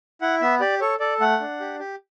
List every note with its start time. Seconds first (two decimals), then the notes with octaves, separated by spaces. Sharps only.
0.22 E4 F#5
0.41 B3 E5
0.60 G4 D5
0.81 A4 C#5
1.00 A4 D5
1.20 A3 F#5
1.40 D4
1.60 G4
1.79 G4